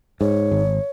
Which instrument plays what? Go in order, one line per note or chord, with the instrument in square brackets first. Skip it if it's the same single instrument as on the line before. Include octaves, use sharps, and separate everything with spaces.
[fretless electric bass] G#2 [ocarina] C#5
[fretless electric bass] G#1